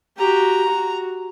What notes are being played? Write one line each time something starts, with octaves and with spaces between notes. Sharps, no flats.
F#4 G4 A#5
F#4